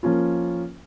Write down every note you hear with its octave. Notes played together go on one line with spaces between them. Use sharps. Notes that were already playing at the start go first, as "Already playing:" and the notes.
F3 A#3 C#4 F4